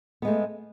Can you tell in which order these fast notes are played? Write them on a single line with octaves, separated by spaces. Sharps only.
B3 G#3 A3